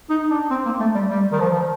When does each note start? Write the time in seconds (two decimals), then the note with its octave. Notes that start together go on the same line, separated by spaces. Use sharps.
0.10 D#4
0.30 D4
0.51 C4
0.65 A#3
0.80 A3
0.95 G3
1.10 G3
1.32 D#3
1.40 F3